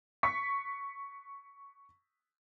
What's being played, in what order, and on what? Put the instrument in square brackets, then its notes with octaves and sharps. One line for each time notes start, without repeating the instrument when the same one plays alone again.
[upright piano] C#6 B6